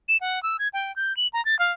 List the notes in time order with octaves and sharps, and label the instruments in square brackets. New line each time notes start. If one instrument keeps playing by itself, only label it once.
[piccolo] E7
F#5
E6
G#6
G5
G6
F#7
A#5
A6
F5